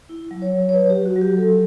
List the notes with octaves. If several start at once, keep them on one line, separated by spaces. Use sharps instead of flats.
E4
F#3
C#5
F#3
C#5
F#3 B4
F#3 G4
F#4
F#3
G4
F#3 A4